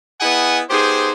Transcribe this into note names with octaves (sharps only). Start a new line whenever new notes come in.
B3 E4 G#4 D#5 F#5 G#5
B3 D#4 G4 G#4 C5